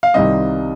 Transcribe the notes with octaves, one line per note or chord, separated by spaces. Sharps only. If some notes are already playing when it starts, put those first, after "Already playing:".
F5
C2 C3 D#3 G3 C4 D#5